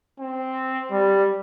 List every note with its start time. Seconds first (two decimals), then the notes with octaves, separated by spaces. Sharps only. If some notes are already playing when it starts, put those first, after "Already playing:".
0.20 C4
0.91 G3